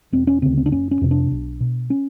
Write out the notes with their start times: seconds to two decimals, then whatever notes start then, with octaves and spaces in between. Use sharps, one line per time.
0.12 E1 C4
0.27 C#4
0.42 D2 C#3 C4
0.57 C4
0.66 D4
0.72 F#1 C#4
0.91 C#4
1.01 F2 C3
1.11 D4
1.31 B1
1.60 B2
1.90 C#4